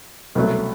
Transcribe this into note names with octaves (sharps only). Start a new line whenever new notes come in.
C2 B2 F#3 A3